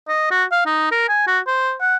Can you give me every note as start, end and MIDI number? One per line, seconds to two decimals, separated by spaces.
0.08 0.30 75
0.31 0.44 66
0.52 0.61 77
0.66 0.89 63
0.92 1.09 70
1.09 1.26 80
1.27 1.40 66
1.47 1.74 72
1.81 1.97 78